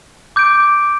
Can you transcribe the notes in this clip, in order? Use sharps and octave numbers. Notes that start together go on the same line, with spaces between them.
D6 G6 D7